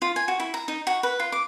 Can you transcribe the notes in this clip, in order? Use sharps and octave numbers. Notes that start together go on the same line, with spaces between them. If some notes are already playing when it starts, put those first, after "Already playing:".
F4
G#5
F#4
E4
A#5
D#4
F#4
B4
F4
D6